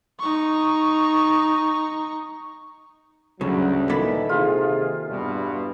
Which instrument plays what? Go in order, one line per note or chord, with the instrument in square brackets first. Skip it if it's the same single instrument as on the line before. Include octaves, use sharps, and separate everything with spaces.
[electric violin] D#4 C#6
[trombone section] D2 [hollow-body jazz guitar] G2 C#3 [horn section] F#3
[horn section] A#2 D#3 E3 [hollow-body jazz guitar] A#3 A4 B5
[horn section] C3 D#3 [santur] F4 [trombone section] G#4
[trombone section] E2 G2 B2 [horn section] G3